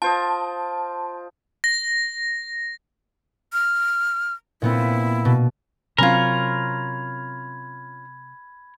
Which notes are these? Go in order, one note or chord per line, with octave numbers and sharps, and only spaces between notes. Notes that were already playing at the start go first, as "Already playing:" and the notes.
F4 C5 D#5 A5
A#6
F6
A#2 B3 C4 E4
B2
C3 F#3 C4 C#4 F4 A#4 B5 G#6